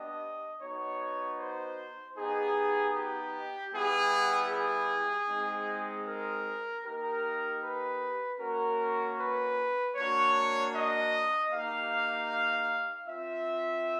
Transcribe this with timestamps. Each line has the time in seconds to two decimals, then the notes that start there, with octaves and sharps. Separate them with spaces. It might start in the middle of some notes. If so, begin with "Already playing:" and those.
Already playing: B3 D4 G4 D#5
0.61 B3 D#4 F#4 C#5
1.38 C5
2.16 B3 D#4 G4 G#4
2.94 G4
3.72 G3 B3 E4 G4 G#4
4.50 G#4
5.28 G#3 C4 D#4
6.06 A#4
6.84 A#3 D#4 G4 A#4
7.62 B4
8.39 A#3 C#4 F#4 A#4
9.17 B4
9.95 A#3 D4 F#4 C#5
10.73 D#5
11.51 A#3 D#4 G4 F5
13.07 C4 F4 E5